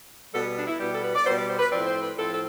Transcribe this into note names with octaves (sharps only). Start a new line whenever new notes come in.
B2 G3 B3 A4
D4
E4
B2 G3 B3 G4
A4
B4
D5
B2 G3 B3 C5
D5
C5
B4
A2 F3 C4 D5
C5
B4
A2 F3 C4 A4
A4